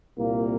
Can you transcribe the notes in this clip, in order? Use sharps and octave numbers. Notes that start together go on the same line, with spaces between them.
C2 A#2 A#3